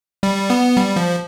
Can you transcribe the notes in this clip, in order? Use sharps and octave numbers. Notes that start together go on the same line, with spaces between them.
G3
B3
G3
F3